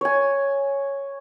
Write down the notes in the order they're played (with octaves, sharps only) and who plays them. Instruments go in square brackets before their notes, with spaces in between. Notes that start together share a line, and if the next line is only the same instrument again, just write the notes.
[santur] C#5 G#5